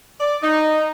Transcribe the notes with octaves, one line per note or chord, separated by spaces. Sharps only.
D5
D#4